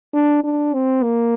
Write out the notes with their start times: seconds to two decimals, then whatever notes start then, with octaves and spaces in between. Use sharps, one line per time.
0.14 D4
0.44 D4
0.74 C4
1.03 A#3